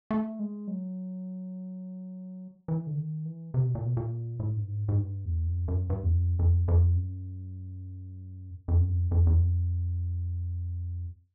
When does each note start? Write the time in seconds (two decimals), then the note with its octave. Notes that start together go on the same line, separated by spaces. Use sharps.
0.11 A3
0.39 G#3
0.68 F#3
2.68 E3
2.87 D3
2.97 D#3
3.25 E3
3.54 C3
3.64 B2
3.75 A#2
3.85 B2
3.97 A#2
4.40 A2
4.56 G2
4.68 G#2
4.89 G#2
4.97 G2
5.25 E2
5.47 F2
5.68 F#2
5.90 G2
6.03 E2
6.11 F2
6.39 F2
6.68 F2
6.97 F#2
8.68 F2
8.81 F#2
8.89 F2
9.11 F2
9.27 E2
9.33 F2